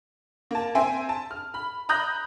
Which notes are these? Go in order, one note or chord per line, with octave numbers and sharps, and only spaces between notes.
A#3 A5
C4 E5 G5 G#5 C6
A5
F6
B5
A#5 B5 D#6 F#6 G6 A#6